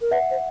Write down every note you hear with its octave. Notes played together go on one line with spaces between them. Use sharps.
A#4
B4 E5 F#5
C5